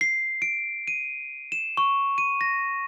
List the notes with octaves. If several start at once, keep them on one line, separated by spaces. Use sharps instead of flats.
C7
D7
D#7
E7
C#6
D#7
A#6